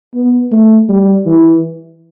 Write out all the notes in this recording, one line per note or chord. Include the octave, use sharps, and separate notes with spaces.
B3
A3
G3
E3